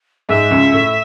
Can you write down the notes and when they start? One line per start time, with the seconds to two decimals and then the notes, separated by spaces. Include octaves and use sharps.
0.29 G#2 G#3 E5
0.51 C#2 C#3
0.73 A2